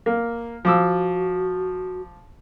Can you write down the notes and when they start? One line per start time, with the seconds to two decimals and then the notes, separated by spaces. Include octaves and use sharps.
0.06 A#3
0.65 F3 F#4 D6 E6